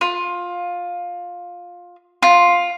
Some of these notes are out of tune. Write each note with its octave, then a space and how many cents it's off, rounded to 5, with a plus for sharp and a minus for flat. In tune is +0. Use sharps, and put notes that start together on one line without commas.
F4 +15
F4 +5